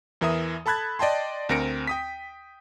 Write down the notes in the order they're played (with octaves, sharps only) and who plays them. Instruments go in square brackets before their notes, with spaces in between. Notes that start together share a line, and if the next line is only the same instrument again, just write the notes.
[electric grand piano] E2 E3 A#4 E5 D#6
A4 A5 B5 F#6 G#6 A6
D5 D#5 G5 A5 C6
D2 C4 A#4 A#6 C#7 D7
G5 D#6 B6